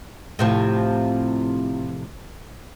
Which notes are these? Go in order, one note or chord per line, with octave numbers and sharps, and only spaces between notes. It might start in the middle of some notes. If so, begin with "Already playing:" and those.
A2 C3 F3